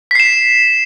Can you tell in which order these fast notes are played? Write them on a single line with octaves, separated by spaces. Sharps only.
B6 C7 E7